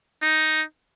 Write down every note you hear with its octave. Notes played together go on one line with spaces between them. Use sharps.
D#4